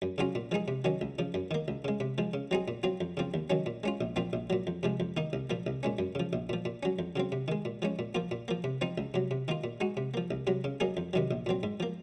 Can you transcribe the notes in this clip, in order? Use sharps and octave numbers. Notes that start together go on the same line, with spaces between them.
F#2
C#3 F#3 C#4 F4
A#2
F3 G#3 D#4 G#4
C3
D#3 F#3 C#4
C#2
C#3 F3
F#2
D#3 A#3
C#2
C#3 G#3
C3
F3 G#3
C#3
F#3 C4 D#4 G#4
A#2
F#3 C4 F4
F2
C#3 F3 C4
D#2
D#3 F#3 C#4
A#2
G#3 C#4 F4
A#1
A#2 F3 C4 F4
A#1
A#2 F#3
F2
C3 F3 G#3
F2
D#3 A#3 D#4
C2
A#2 F3 A#3
C2
A#2 G#3 C#4
F#2
C#3 F3
A#1
A#2 F3
A#2
F#3 C#4
F2
C#3 F#3 C4
C3
D#3 G#3
A#2
F3 G#3 C#4
A#2
F3 A#3 F4
A#2
F3 A#3
C3
F3 C4 D#4
C#2
C3 F#3
C3
D#3 A#3 F4
A#2
G#3 D#4 F#4
C3
F3 A#3
C2
C3 F#3
C#3
F#3 A#3 D#4 G#4
F2
C3 D#3 F#3
A#1
A#2 F#3 C4
G#2
F3 A#3